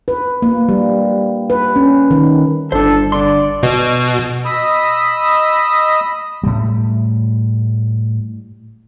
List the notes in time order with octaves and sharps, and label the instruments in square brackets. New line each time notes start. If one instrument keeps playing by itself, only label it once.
[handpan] B4
A#3
G3
B4
C#4
D#3
[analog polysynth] G1 [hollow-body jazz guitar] D4 C5 [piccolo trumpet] A4
[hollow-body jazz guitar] D3 C6 [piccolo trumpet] D5
[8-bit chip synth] B2
[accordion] D#5 B5 D#6 E6
[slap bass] A2 G3